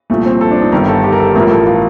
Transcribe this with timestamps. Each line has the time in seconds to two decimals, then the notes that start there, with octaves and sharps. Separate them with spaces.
0.10 C2 A#2 F3 A3
0.25 C4
0.41 A4
0.51 D4
0.61 D#4
0.72 G1 G2 D#3 A#4
0.89 A4
1.04 G4
1.12 A#4
1.20 A4
1.36 A1 A2 F3 A#4
1.51 A4
1.67 F4